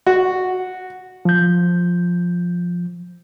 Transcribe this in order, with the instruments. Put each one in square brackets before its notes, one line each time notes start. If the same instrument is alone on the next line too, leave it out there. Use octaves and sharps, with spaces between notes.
[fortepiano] F#4
[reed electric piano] F3 G6